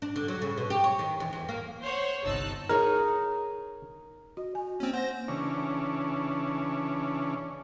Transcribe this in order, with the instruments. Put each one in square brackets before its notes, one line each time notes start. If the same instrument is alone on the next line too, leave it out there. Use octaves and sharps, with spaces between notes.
[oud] D4
D3
F#3
C#3
B2
G4
C#5
D#3
E2
E2
A#3
[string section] C5 C#5 F#5
G1 C2 D#4 A5 E6 F#6
[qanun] D#4 G#4 C#5 [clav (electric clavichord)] A#4
[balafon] F#4 [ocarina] D#5
[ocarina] F#4 [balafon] G#5
[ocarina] A#3 [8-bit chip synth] C4 C#4
[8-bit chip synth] C5 A#6 [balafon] F#5
[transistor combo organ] C#3 E3 C#4 D4